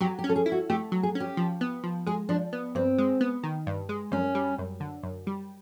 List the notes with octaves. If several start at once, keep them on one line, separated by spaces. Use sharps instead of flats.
F#3 G4
G4
C#4
A4
G#4
E4
F#4
A3 G4
F#3
G#4
C#4
G4
F3
B3
F3
G#3 G#4
F3 D4
B3
G2 C4
G#3
B3
D#3
G2
G#3
F#2 C#4
G3
F#2
D3
F#2
G3